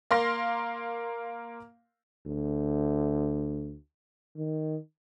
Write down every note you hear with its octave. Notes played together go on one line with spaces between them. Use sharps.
A#3 F5 C6 A#6
D2
D#3